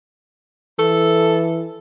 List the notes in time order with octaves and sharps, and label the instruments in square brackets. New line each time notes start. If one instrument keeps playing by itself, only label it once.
[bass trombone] E3 [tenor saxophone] A4